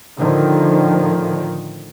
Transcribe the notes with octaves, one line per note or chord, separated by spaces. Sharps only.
A2 D3 D#3 F3